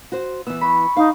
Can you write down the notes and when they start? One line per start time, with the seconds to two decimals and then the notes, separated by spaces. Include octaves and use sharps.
0.12 F#4 C5
0.47 E3 B3 E6
0.61 B5 C#6
0.97 D#4 F5